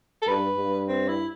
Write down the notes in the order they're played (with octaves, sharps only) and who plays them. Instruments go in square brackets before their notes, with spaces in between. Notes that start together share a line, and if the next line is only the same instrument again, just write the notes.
[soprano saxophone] A4
[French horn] G2 [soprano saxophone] B4
[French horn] G2
[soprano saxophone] C4
E4